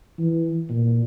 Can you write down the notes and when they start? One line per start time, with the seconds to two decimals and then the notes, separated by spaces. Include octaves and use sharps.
0.19 E3
0.70 A#2